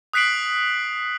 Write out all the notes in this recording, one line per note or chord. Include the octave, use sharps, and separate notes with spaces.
D#6 F#6 B6 C7 D7 F#7